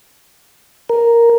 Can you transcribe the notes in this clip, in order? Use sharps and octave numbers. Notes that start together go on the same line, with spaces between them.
A#4